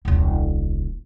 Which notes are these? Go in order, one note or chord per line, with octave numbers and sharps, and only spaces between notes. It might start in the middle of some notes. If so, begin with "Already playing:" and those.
D#1 C2